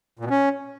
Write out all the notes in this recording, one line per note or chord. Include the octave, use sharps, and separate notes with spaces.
A#2
B2
C#4